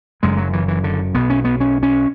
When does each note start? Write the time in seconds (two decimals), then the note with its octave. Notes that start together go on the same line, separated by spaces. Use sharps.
0.23 F#1 F#2 C#3 G#3
0.38 F#3
0.53 E3
0.68 E3
0.84 D3
1.15 B1 B2 B3
1.30 C#4
1.45 B3
1.60 C#4
1.83 C#4